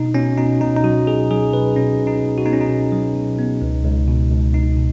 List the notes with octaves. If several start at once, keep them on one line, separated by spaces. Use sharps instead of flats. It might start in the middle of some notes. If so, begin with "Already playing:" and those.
Already playing: B2 D#4
B2 C#4
B2 D#4
B2 D#4
D#4
F#3 F#4
B2 G#4
F#3 G#4
B2 B4
B2 C#4
B2
D#4
B2
F#4
B3 D#4
C#4
D#4
B2
F#3
B2
B3
C#2
C#2
B2
C#2
C#2 D#4
B2